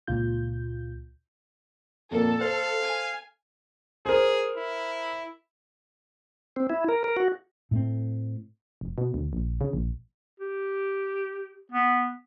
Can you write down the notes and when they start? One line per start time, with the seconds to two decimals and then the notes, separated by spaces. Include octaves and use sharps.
0.07 C#2 A#2 F4 G6
2.11 F2 A#2 A#3 A4
2.41 C5 F5
2.81 G#5
4.06 G#4 A#4 C5
4.57 E4
6.56 C4
6.70 E4
6.89 A#4
7.04 A#4
7.17 F#4
7.71 A2 A3 C4
8.81 F1
8.98 B2
9.14 D2
9.33 A#1
9.61 C#3
9.73 A#1
10.40 G4
11.72 B3